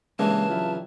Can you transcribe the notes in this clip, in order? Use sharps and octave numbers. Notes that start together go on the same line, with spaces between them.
G2 C#3 E3 G#3 A#3 A5
F#3 E4 F4